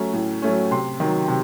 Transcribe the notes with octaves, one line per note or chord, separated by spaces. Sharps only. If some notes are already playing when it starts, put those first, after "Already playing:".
Already playing: F#3 A3 C#4 A#5
A2
F#3 A3 C#4
C3 C6
D#3 F#3
C3